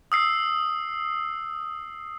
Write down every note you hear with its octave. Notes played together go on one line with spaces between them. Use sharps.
D#6 E6 C7